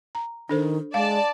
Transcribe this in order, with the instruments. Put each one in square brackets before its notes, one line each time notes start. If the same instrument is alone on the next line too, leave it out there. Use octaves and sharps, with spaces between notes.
[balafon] A#5
[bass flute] D#3 [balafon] D4 A4 C5
[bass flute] G#3 [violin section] D5 A5 [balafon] F5